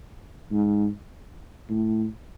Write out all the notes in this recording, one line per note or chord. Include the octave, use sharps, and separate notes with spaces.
G#2
A2